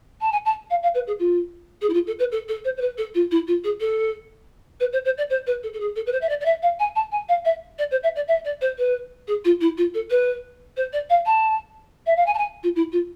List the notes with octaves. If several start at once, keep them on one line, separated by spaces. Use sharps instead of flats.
A5
G#5
A5
F5
F5
B4
G#4
F4
G#4
E4
F4
A4
B4
A4
A4
C5
C5
B4
A4
F4
E4
F4
G#4
A4
B4
C5
C5
D5
C5
B4
A4
A4
G#4
A4
B4
C5
E5
D5
D5
E5
F5
G#5
A5
G#5
F5
E5
D5
C5
E5
D5
E5
D5
C5
B4
G#4
F4
E4
F4
A4
B4
C5
D5
F5
A5
E5
F5
G#5
A5
G#5
F4
E4
F4